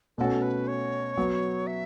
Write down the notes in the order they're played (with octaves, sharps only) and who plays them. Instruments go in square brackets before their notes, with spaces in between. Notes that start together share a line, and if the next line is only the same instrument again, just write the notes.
[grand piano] B2 A3 C#4 F#4 [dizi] A4
[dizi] B4
C#5
[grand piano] F#3 B3 F#4
[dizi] E5